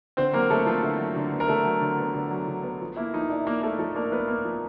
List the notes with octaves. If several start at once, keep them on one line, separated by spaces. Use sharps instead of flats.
D3 C4 C5
F#3 A#3 A#4
D3 A3 A4
F3 B3 F4
D3 E4
F#3
D3
B3
A#4
D3 A3 A4
F#3
D3
B3
D3
F#3
D3
B3
F3
A#3 E4
F3 D#4
D4 E4
F3 A#3 A#4
A3 A#3 A4
F3 A3 A4
A#3 D4 A#4
F3 B3 B4
A#3
F3